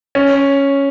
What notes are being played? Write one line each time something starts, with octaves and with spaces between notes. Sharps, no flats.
C#4